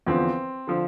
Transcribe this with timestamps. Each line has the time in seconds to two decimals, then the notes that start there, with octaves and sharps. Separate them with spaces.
0.07 E2 D3 F3 C4
0.67 D3 F3